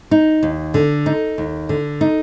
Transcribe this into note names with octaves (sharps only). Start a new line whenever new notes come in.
D#4
D#2
D3
D#4
D#2
D3
D#4